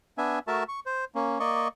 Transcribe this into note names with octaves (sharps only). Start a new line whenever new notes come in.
B3 D4 E5 G#5
A3 F#4 A#4 E5 A5
C#6
C5
A#3 C#4
A#3 D5 D#5 C#6